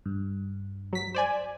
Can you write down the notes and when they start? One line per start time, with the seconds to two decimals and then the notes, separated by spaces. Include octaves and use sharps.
0.06 G2
0.93 F#3 B6
1.14 C5 D5 G#5